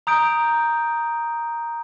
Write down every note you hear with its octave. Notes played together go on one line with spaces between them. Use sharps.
A#5 D#6 G6 D7